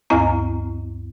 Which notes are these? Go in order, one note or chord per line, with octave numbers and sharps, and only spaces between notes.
D2 G2 C4 E4 A#5